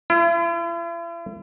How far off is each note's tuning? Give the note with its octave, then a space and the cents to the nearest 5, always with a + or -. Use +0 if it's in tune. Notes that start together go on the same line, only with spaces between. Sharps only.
E4 +45